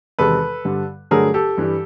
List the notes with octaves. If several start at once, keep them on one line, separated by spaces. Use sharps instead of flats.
E2 C3 D#3 G#3 A4 B4
G2 D3 G3
G2 D3 F#3 A3 G#4 A#4
G4 A4
G2 E3 G3